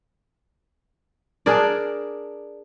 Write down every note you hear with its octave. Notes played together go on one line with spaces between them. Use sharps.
D4 G#4 A#4 D5